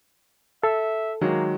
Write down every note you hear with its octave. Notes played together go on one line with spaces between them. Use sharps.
A4 E5
D#3 F#3 G#3 A#3